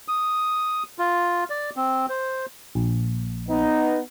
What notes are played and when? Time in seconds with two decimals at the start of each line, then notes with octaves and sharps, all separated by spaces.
0.08 D#6
0.99 F4
1.50 D5
1.76 C4
2.09 C5
2.75 A#1
3.48 B3 D#4